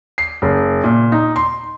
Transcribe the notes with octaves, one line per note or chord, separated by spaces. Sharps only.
C7
F#1
A#2
D#4
C6